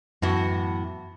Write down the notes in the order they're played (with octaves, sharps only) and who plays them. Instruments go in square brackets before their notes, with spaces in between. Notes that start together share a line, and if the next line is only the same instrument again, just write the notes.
[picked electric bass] F#2 [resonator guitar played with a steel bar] A2 E3 B3 F#4